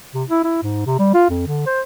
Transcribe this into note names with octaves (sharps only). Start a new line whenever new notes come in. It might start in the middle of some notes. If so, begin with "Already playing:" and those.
C3
E4
E4
G#2
C3
G3
F4
F2
D3
C5